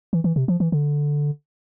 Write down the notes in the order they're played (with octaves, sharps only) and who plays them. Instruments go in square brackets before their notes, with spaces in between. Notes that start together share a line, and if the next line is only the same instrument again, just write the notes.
[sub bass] E3
E3
C3
F3
E3
D3